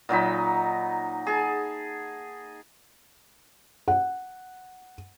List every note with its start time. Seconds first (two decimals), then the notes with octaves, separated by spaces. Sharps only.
0.09 A#2 F#3 D#4 B5
1.26 G#4 A5
3.88 F#5